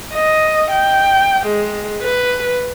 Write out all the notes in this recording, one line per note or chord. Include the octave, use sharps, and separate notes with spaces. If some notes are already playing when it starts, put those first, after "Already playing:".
D#5
G5
G#3
B4